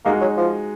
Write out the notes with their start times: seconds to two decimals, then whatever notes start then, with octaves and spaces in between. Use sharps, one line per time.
0.05 G#3 A#3 D#4 F#4
0.21 F#3
0.37 F3